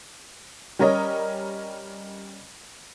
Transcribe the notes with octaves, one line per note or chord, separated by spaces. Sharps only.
G3 C#4 A#4 C#5 D#5